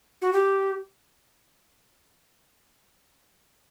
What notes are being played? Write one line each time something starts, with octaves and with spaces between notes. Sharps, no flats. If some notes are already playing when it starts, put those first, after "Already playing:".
F#4
G4